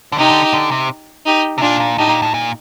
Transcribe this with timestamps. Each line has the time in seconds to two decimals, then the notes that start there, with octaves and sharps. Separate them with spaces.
0.12 D3
0.18 C3 D#4 G4
0.30 D3
0.54 D3
0.71 C3
1.26 D#4 G4
1.58 C3
1.61 A#2 D4 F4
1.80 A#2
1.98 A2 D#4 G4
2.09 A#2
2.22 A2
2.34 A#2